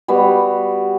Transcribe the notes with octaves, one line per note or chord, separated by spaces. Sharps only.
G3 B3 F#4